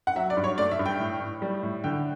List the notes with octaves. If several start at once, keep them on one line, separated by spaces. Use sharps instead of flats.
F#5
F#3 E5
D5
G2
C#5
A3 D5
E5
G2
G5
A2
A2
G3
A2
D3 G5